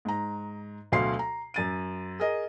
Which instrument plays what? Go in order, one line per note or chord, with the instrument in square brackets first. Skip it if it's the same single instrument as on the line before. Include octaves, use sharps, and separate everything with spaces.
[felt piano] G#2 A#5
D2 B2 F#3 F5 C6 C7
A#5
F#2 A6 D#7
G#4 A#4 D#5